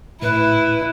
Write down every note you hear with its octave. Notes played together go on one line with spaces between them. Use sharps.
A2 E4 B4